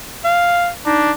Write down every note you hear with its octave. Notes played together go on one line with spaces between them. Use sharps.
F5
D4 D#4